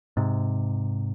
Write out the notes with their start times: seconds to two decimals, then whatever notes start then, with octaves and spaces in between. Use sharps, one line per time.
0.17 G#2 C3